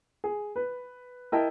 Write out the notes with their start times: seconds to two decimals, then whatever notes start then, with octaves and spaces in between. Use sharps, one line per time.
0.24 G#4
0.56 B4
1.32 E4 A#4 D#5 G5 A5